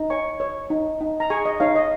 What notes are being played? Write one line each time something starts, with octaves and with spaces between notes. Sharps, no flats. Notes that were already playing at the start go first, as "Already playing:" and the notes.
Already playing: D#4
C#5 G#5 C#6
C#5
D#4
D#4
A#5
G#4 G#5 C#6
D#5
D#4 C#5 F5
D#5